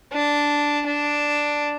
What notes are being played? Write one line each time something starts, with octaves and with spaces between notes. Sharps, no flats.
D4
D4